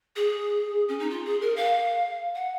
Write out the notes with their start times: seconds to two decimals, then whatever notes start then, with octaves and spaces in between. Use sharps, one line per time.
0.16 G#4
0.88 C#4
0.99 D#4
1.10 F4
1.25 G#4
1.41 A#4
1.56 F5
2.35 F#5